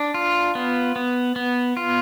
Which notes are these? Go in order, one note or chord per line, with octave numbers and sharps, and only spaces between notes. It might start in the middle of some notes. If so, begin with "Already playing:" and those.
Already playing: D4
F4
B3
B3
B3
F4